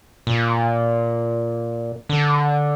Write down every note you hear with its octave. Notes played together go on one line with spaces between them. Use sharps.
A#2
D3